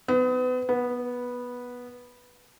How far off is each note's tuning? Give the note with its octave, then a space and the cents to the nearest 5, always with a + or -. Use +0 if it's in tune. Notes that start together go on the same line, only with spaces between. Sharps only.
B3 +35
B3 -10